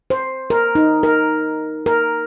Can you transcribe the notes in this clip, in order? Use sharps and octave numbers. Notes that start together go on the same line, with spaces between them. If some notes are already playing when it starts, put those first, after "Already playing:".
C5
A#4
D#4
A#4
A#4